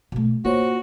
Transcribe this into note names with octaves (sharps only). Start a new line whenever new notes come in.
B2 A3
A#3 F4 F#4 C5 C#5